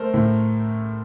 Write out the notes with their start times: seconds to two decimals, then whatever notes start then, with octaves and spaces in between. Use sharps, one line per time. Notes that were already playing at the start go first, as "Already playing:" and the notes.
Already playing: A3 A#4 C5
0.14 A2